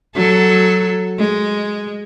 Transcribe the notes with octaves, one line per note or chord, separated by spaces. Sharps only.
F#3 A4
G#3